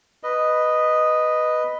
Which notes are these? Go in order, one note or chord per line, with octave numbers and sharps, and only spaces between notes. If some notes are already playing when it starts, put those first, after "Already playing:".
B4 D#5